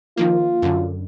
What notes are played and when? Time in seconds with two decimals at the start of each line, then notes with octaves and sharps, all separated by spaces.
0.17 D#3 F3 A#3 F4
0.62 F#2 D3